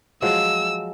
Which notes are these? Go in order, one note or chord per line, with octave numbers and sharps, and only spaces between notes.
F3 F#3 G#3 E6